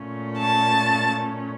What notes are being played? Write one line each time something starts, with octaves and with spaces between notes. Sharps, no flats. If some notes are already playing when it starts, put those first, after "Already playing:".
Already playing: A#2 A3 C#4
A5